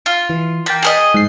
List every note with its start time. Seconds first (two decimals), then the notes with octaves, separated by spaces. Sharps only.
0.06 F4
0.30 E3
0.66 A#3 G5 A6 B6
0.82 G#4 A#4 D#5
1.14 G#2 C7